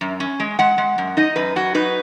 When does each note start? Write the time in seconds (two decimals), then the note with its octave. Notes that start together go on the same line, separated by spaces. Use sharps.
0.01 F#2
0.20 C#4
0.40 G#3
0.59 G#3 F#5
0.78 G#3
0.98 F#2
1.17 D#4 D#5
1.36 F#2 B4
1.56 F#3 F#4
1.74 D#4 B4